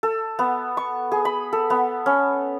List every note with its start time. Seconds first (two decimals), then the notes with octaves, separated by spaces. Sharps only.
0.03 A4
0.39 B3
0.77 C#6
1.12 G#4
1.25 B5
1.53 A4
1.70 B3
2.06 C#4